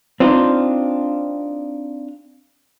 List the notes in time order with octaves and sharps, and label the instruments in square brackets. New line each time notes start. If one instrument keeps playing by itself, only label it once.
[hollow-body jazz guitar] C4 D4 D#4 F4